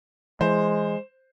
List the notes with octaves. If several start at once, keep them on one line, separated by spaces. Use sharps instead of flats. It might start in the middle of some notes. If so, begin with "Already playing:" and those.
E3 G#3 C5